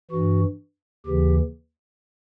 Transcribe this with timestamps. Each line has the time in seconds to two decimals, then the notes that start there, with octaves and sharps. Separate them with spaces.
0.11 G2 E3 F#4
1.06 D#2 C#3 E3 G4